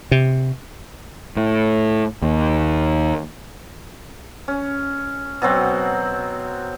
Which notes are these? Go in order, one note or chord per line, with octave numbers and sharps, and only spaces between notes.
C3
A2
D#2
C#4
B2 F#3 C4 F#5